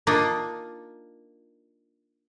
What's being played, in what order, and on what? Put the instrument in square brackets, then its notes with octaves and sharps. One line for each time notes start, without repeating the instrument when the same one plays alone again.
[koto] A#3 D4 D#4 F4